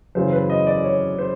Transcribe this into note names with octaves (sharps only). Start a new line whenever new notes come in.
F#2 C#3 E3 C5
B4
D#5
D5
C#5
C5